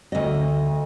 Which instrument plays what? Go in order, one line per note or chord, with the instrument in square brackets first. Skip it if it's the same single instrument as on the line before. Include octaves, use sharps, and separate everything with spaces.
[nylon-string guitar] D2 D#5